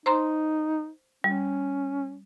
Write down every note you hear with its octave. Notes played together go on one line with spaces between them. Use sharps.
D#4 C5 A#5 C6
G3 C#4